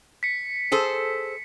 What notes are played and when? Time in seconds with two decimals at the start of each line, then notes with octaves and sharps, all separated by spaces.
0.23 B6 C#7
0.72 G#4 A4 C5